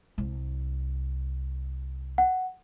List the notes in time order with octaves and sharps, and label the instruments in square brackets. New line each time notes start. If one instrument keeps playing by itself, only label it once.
[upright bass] C2
[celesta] F#5